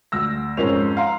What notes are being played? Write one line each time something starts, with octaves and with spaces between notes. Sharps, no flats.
D2 E6 A#6
F2 G#2 C#4 A#4 C5 F7
F5 F#5 A#5 C6